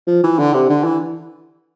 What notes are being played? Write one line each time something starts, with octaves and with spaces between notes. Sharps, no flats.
F3
E3
D3
C3
D3
E3